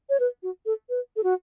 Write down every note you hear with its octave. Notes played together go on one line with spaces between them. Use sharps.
C#5
B4
F#4
A4
B4
A4
F#4